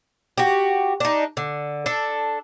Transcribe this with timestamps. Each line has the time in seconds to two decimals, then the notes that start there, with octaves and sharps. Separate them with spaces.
0.38 F#4 G4
1.00 D4 D#4
1.37 D3
1.86 D4 A4